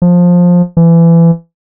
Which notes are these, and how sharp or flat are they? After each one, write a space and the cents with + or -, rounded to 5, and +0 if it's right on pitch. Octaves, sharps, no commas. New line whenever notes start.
F3 +15
E3 +25